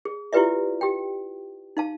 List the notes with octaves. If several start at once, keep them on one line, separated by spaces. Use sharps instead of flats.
G#4
E4 F4 G4 B4 D5 E5
G4 G5
D#4 F5 A5